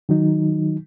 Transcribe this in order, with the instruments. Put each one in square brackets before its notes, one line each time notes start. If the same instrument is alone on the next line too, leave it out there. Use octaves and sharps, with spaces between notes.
[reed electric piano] D#3 F#3 D#4